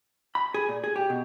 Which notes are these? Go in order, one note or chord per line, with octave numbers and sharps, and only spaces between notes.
B5
G#4
A#2
G#4
G4
B2